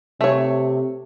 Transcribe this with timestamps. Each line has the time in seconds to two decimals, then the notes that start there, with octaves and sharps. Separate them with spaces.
0.21 C3 A3 C#5